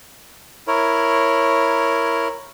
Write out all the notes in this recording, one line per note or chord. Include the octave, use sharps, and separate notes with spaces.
E4 A#4 C#5